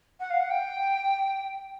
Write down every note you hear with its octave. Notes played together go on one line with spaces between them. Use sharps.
F#5
F5
F#5
G5